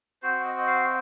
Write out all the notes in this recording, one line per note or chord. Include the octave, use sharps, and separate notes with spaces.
C4 F#4 C5
D#5
D#5
F5